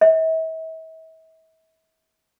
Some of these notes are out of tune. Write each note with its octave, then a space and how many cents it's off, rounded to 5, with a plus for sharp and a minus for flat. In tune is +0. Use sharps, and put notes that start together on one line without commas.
E5 -40